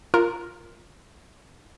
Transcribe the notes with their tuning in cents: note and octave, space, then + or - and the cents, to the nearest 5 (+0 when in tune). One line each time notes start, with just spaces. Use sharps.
F4 +0 A#4 +0